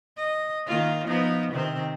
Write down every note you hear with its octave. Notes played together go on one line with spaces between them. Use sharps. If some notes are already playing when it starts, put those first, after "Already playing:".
D#5
D#3 A#3 F4
F3 B3 D#4
C3 D#3 C4